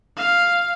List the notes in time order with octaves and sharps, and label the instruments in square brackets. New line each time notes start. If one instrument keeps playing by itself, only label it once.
[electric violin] F5